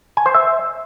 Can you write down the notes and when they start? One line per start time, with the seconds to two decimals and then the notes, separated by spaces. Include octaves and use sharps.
0.17 G#5
0.26 C5
0.34 E5